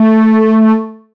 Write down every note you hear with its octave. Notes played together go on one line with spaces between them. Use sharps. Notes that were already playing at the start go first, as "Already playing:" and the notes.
Already playing: A3